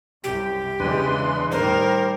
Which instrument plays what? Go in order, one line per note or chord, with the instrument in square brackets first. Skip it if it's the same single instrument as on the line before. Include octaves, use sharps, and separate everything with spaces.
[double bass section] C2 F#2 [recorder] G4
[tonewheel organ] E2 D4 B4 [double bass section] C#3 E3 G#3 [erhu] C6
[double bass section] A2 D#3 G3 [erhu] A#4 [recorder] C5